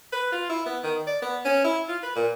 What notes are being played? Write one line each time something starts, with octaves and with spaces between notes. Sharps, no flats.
B4
F4
E4
B3
D#3
D5
B3
C#4
E4
F4
B4
A#2